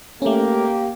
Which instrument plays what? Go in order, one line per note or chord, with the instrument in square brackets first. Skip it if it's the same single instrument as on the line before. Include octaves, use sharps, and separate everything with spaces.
[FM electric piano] A3 C#4 [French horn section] A#3 G4